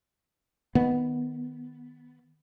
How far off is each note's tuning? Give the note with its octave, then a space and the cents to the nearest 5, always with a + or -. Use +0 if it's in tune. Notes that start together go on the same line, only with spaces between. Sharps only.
D#3 -5 B3 +0